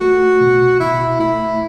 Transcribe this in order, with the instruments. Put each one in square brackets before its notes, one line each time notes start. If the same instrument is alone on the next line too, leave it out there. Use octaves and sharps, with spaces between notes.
[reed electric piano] A3 [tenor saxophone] F#4
[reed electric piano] B2
[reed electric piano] B2 [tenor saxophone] E4
[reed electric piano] A3 [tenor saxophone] E4